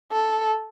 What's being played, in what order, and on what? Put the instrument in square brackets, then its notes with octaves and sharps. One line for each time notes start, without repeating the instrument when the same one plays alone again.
[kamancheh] A4